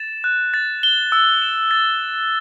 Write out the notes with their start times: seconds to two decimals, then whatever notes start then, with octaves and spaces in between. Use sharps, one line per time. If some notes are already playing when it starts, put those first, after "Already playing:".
Already playing: A6 E7
0.24 F#6
0.54 A6
0.83 G7
1.12 E6
1.42 E7
1.71 A6